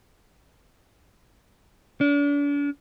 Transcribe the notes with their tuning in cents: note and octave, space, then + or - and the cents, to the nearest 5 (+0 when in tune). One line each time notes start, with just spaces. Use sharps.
D4 -40